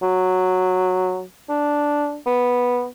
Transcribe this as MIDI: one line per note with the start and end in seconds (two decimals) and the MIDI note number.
0.02 1.23 54
1.49 2.16 62
2.27 2.86 59